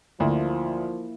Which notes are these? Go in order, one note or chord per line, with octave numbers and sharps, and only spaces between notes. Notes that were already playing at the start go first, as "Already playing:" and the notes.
D2 F3 A#3 E4